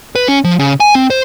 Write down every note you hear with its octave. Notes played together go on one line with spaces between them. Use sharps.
B4
C#4
F3
C#3
G#5
C4
C5